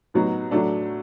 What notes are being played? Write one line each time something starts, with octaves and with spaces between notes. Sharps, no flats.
A2 F#3 B3 D#4 F#4
A2 F#3 A3 D4